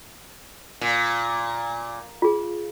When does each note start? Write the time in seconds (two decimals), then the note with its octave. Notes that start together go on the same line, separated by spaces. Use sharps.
0.81 A#2
2.22 F4 G#4